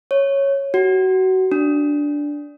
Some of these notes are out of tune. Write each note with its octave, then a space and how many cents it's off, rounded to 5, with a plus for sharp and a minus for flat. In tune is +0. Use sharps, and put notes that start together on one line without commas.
C#5 -5
F#4 +25
D4 -5